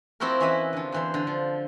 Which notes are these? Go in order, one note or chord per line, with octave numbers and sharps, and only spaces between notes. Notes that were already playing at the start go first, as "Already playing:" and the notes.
F3 C4 E4 F#4 G4 A#4
E3 C#4 E4 D#5 E5
D3 F3
E2 E3 C5
D3
F3